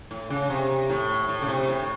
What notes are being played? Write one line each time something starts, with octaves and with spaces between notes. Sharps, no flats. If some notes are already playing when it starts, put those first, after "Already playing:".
A2
C#3
C3
A2
A2
C#3
C3
A2